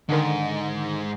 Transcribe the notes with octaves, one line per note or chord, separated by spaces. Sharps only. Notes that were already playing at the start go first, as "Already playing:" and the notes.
G#2 D3 D#3